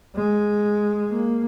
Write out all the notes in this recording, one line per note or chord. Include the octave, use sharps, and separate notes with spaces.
G#3
A#3